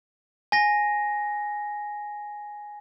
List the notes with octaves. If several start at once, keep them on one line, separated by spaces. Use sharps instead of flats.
G#5 A#6